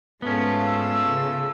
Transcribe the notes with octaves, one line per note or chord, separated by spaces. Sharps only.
G#2 A3 B3 C#4 F4
E6
C#3